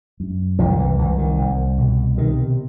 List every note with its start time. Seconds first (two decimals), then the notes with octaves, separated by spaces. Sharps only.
0.20 F#2
0.59 C2 F3
0.70 D#3
0.79 E3
0.98 C2 E3
1.18 D#3
1.38 C2
1.78 B2
2.17 C3 D#3